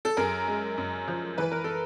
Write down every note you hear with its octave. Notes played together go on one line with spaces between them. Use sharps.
A4
F#2 G#4 A#4
G#3
F#2
F3
E3 B4
A#4
A4